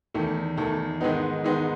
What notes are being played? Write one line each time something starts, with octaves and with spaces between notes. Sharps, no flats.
E2 D#3 A3
E2 D#3 A3
G#2 D#3 G#3 B3 D#4
G#2 D#3 G#3 B3 D#4